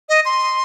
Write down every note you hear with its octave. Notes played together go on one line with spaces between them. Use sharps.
D#5
C6